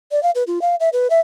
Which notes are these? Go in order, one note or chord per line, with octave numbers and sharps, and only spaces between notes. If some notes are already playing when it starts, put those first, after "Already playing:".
D5
F5
B4
F4
F5
E5
B4
E5